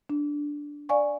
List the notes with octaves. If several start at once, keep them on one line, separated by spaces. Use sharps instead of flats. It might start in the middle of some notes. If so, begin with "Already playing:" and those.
D4
D5 F5 G#5 C#6